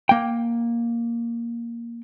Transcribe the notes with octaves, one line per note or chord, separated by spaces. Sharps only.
A#3 G5